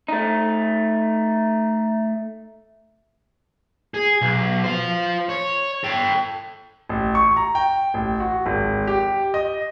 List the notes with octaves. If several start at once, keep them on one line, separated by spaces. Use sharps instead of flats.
A3 D#4
G#4
B1
F4 C5
C#5
A4 G5
A1
C#6
A#5
G5
A1
F#4
G#1
G4
D#5